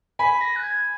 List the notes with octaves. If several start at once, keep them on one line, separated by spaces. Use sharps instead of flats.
G#5 B5 B6
A#6
F#6
G#6